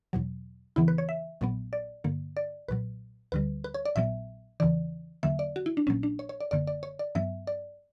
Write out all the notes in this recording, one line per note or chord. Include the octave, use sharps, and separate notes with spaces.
E2 B2 F#3
E2 C#3 E3 B3 E4
B4
C#5
E5
A#1 A#2 F#3 B3
D5
G2 D3 A#3
D5
B1 A#2 F#3 B4
D2 D3 G3 B4
B4
C#5
D5
A#1 A#2 F#3 B3 E5
E2 C#3 E3 D5
E2 D3 F#3 A#3 E5
D5
F#4
E4
D4
A#1 A#2 F#3 A#3 C#4
D4
C#5
C#5
D5
G1 F#2 D3 A#3 D5
D5
C#5
D5
G2 F#3 B3 E5
D5